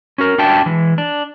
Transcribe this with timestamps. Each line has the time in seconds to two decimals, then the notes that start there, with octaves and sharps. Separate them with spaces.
0.18 C#4 F#4 A#4
0.38 D4 F#4 E5 G5 A5
0.66 E3 G#3
0.98 D4